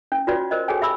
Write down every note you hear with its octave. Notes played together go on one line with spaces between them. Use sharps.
C#4
F4 F#4 B4 C#5 D5
A#4 C5 D5 D#5
F#4 G#4 A4 C#5 G5 G#5
G4 E5 B5 E6